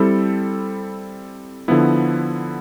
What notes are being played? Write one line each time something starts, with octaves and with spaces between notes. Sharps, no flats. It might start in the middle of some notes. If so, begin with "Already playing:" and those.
Already playing: G3 C4 E4 A4
D3 F3 B3 E4